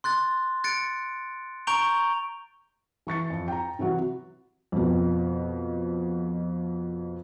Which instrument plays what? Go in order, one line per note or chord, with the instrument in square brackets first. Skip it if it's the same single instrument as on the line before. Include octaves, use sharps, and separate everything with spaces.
[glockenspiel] C6 F#6 A6
F#6 A6 C#7 D7
A#5 C#6 G6 D7 F7 G7
[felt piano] E3 C#6 A6 C#7
F2
G5 A#5
C3 E3 F#3 F#4
F2 B2